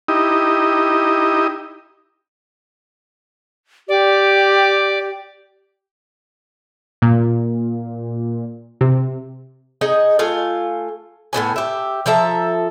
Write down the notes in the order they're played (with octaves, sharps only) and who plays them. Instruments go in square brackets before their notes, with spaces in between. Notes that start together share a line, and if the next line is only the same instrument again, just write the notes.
[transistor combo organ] D#4 E4 G4 D#5
[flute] G4 [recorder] D5
[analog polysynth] A#2
C3
[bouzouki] D#4 G#4 D#5
A3 F4 F5 G#5
A2 C3 B3 G#5
G4 E5
F3 A4 E5 A#5